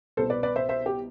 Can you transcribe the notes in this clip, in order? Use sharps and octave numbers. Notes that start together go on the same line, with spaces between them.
C2 B2 B3 A4 C5
B4 D5
B4 D5
C5 E5
C5 E5
G4